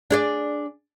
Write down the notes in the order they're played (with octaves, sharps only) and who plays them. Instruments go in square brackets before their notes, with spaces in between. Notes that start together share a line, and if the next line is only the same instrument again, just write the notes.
[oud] D4 G#4 D5